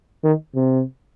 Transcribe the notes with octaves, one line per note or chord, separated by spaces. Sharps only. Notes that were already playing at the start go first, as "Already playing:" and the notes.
D#3
C3